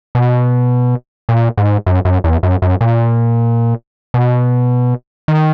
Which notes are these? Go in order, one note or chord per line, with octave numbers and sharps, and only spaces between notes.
B2
A#2
G#2
F#2
F#2
E2
F#2
F#2
A#2
B2
D#3